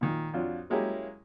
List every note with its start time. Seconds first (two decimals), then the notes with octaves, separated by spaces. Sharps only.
0.01 A#2 D#3
0.34 F2 D4 F4 F#4 C#5
0.70 F#3 G#3 A#3 C#4 E4 G4